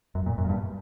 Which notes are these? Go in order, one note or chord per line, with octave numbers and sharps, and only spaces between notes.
F#2
A#2
F#2
A#2
G2